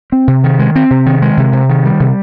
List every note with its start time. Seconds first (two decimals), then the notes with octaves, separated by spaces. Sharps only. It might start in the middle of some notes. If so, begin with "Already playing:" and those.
0.12 C4
0.28 C3
0.44 D#3
0.59 G#3
0.75 C4
0.90 C3
1.06 D#3
1.22 G#3
1.37 C3
1.53 C3
1.70 D#3
1.85 G3
2.00 C3